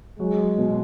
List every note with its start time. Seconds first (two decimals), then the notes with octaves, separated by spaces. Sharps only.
0.19 F#3 G#3
0.58 B2